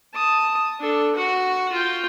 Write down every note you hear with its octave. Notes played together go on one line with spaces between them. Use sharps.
A5 D#6
D4 A4
F#4 F#5
F4 G5